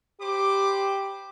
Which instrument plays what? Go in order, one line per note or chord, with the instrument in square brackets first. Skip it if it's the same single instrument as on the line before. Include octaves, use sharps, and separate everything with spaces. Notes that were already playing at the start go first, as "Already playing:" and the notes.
[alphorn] G4 [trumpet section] C5 B5 D6